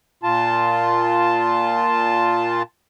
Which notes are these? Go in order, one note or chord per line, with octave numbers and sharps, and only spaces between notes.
A#2 F4 A5